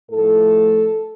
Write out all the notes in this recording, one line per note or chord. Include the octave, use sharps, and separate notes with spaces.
A2 F3 A3 A4